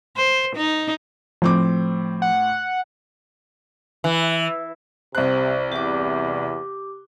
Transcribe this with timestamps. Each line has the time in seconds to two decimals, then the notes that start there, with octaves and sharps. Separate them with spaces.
0.16 C5
0.55 D#4
1.42 A2 F3 C4 D6
2.22 F#5
4.04 E3
5.15 C2 C3 C5 F#6
5.72 E2 G4 D6